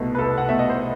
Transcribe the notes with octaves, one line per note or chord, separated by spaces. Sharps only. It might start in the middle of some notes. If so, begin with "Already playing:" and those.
Already playing: C2 B2 A3
B4
C2 A4
F#5
B2 A3 E5
D#5
C5